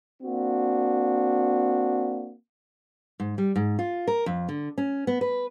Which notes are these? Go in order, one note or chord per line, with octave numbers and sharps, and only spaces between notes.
A#3 C4 D4 F#4
G#2
G3
G#2
F4
A#4
F2
D3
C#4
B3
B4